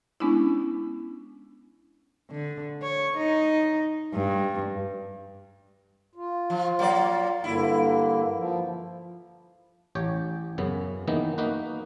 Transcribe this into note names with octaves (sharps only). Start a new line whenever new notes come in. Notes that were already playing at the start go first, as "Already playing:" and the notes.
G#3 B3 C#4 D4 E4
D3
C#5
D#4
G2
F4
F3
F#3 A#3 D5
G2 D3 A#3 E4
F3
A1 G4 C#5 G5
F#2 C#3 B3
D#3 E3 A#3 B3 D#4
A#3 D#4 F#4 B4